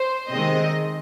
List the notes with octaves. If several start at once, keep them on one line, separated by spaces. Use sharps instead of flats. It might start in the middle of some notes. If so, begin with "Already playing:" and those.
Already playing: C5
C3 D#3 G#3 C4 D#5